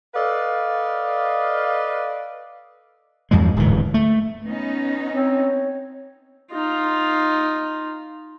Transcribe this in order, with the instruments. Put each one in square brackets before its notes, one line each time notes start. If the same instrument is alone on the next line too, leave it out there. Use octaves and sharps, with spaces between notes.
[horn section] A4 B4 D5 D#5 F5
[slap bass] E2 G2 F3 G#3
D1 G#2 D3 E3
A3
[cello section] B3 C#4 D#4
[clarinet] C4 [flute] C#5
[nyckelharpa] D#4 F4